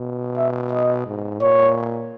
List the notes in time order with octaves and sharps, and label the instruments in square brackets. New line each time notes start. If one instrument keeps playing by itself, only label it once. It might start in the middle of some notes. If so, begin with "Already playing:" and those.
Already playing: [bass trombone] B2
[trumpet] E5
D#5
[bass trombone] G#2
[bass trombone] A#2 [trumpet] C#5